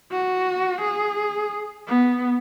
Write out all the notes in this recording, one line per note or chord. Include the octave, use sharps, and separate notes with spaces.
F#4
G#4
B3